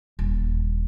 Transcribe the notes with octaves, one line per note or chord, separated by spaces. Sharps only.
D#1